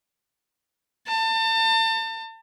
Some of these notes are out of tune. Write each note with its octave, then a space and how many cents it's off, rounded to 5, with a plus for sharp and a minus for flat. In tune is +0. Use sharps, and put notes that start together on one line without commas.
A5 +35